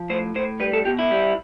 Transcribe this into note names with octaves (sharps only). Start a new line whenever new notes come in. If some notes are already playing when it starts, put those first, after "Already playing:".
Already playing: F3
A2 C5
A2 C5
G3 B4
A4
B2 G4
E4
G3